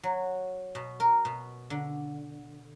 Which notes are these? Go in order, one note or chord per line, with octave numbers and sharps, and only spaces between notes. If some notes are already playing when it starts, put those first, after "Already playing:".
F#3
B2
A#4
B2
D3